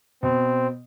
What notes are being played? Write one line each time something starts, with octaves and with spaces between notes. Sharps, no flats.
B2 C4